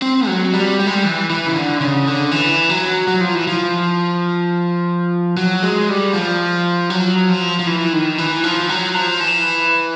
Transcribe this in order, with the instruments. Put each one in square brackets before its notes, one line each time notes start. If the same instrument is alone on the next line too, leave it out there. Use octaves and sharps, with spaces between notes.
[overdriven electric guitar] C4
F#3
G3
G3
G#3
G3
E3
E3
C#3
D3
C#3
D3
E3
F#3
F#3
F3
E3
F3
F#3
G#3
G3
F3
F#3
F3
F3
E3
D#3
E3
F3
F#3
F3
E3